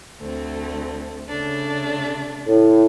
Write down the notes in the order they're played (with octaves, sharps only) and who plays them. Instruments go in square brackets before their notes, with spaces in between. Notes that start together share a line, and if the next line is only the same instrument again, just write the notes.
[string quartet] D2 A3 C4
C#3 A3 D4
[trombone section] A2